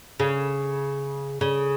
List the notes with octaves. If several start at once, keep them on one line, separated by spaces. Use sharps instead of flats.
C#3
C#3